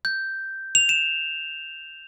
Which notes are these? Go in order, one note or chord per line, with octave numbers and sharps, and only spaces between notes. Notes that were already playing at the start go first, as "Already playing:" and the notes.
G6
F7
E7